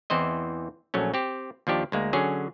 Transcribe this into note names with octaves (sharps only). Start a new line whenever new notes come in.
E2 E3 C4 C5 D#5
A#1 F#3 A3 C#4
C4 G4
D#2 F3 D4 G4
D2 G#3 A#3
D3 F#3 C#4 G#4